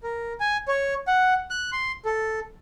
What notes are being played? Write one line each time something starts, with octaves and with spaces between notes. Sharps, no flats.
A#4
G#5
C#5
F#5
F#6
C6
A4